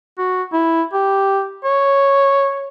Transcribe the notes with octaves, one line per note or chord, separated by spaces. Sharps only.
F#4
E4
G4
C#5